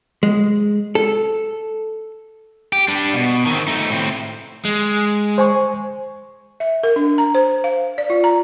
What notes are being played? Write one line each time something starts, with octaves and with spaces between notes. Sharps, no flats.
G#3
A4
G4
G3 D4
B2
D#3 C4
A3 D#4
A2 C4
G#3
C5 G#5 C#6
E5
A#4
D4
A#5
C5
F5
D5
F4
A#5